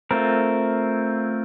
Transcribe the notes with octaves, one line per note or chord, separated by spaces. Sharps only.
A3 C4 F4 A#4